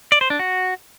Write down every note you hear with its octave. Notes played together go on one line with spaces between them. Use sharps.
D5
C5
D4
F#4